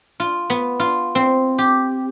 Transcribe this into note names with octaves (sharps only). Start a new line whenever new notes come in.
F4
B3
F4
C4
G4